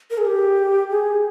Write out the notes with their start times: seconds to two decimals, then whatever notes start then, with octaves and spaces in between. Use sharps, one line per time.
0.11 A#4
0.18 G#4
0.26 G4
0.90 G#4